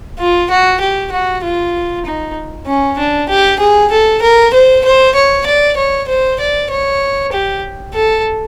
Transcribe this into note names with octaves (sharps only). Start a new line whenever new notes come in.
F4
F#4
G4
F#4
F4
D#4
C#4
D4
G4
G#4
A4
A#4
C5
C5
C#5
D5
C#5
C5
D5
C#5
G4
A4